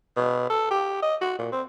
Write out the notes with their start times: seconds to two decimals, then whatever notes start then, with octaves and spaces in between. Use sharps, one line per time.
0.17 B2
0.50 A4
0.71 G4
1.02 D#5
1.21 F#4
1.39 A#2
1.52 C4